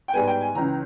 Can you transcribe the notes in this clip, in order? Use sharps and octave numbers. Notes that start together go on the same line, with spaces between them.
G5
G#2 G3 B3 G#5
G5
G#5
C#2 C#3 E3 A#5